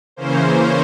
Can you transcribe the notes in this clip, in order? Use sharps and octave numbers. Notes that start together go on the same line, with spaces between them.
C#3 E3 A#3 C#4 C5